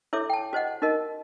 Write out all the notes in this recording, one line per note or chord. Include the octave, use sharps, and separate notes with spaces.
E4 A4 C#5 E5 D6
G5 A5
F#4 C5 D#5 F#5
D#4 F#4 A#4 D#5 A5